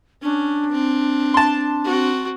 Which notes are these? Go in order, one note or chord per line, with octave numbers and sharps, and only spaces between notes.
C#4 D4
C4
A5 C6
C4 F#4